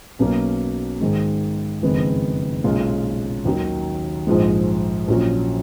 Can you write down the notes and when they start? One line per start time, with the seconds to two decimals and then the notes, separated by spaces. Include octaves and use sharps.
0.19 B1 B2 F#3 A#3 C#4
1.01 G#2 D#3 G#3
1.82 F#1 F2 D#3 G#3 B3
2.64 B1 A#2 G#3 C#4 F4
3.45 D#2 D#3 F#3
4.27 A#1 G#2 F3 G#3
5.08 A#1 A#2 F#3 C#4